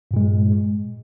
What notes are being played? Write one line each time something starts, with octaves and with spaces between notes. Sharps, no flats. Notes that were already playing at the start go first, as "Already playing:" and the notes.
G2 A#2 G#3